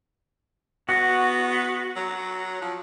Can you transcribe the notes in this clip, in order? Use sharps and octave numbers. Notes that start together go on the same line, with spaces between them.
B3 F#4
F#3
F3